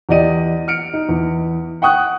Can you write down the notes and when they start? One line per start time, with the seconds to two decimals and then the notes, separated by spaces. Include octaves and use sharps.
0.09 E2 G4 D5 D#5 D#7
0.68 F6 C#7 D7
0.93 D#4
1.09 E2
1.82 F#5 G5 C#6 D#6 F#6